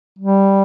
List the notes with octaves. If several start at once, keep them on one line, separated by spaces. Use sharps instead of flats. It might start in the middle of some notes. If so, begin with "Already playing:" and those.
G3